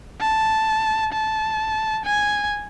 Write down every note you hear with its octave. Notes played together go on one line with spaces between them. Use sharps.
A5
A5
G#5